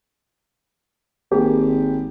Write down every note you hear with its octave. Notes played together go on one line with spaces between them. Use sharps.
G#1 A#3 G4 G#4